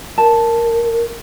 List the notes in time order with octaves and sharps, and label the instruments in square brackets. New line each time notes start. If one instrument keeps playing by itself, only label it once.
[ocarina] A#4 [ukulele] A5